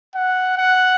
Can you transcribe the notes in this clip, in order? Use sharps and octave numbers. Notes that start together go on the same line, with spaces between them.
F#5
F#5